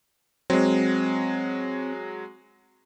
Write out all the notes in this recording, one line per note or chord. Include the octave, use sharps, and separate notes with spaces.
F#3 G#3 C4